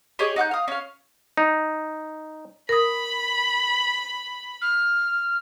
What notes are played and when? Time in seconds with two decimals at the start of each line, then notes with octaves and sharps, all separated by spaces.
0.19 G4 G#4 C#5 D#5
0.36 D#4 F#5 C#6 G6
0.51 F5 D#6
0.68 C#4 F5
1.37 D#4
2.69 A#4 B5 D#6
4.61 F6